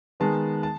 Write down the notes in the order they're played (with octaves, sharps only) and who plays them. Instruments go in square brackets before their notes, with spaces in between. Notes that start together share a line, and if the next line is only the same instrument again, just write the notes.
[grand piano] D#3 G#3 B3 A5
A5